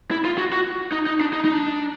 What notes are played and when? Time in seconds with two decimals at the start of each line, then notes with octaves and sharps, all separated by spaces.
0.11 E4
0.25 F4
0.38 F#4
0.52 F#4
0.92 D#4
1.07 D#4
1.21 D4
1.33 D#4
1.45 D#4
1.53 D4